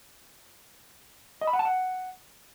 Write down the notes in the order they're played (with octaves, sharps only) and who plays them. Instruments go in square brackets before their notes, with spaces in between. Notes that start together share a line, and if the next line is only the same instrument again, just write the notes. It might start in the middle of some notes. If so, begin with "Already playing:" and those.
[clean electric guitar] D#5
B5
F#5
A5
F#5